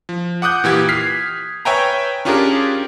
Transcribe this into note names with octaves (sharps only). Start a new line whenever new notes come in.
F3
F#5 D6 D#6 F#6 G6
A#2 E3 G4 G#6
F6 B6 C7
B4 C#5 E5 G5 G#5 A#5
C#4 D4 F4 G4 G#4 A#4